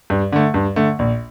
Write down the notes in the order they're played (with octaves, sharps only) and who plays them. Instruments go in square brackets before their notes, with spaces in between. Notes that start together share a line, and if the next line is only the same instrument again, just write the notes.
[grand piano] G2
D3 A3
G2
D3 A3
A#1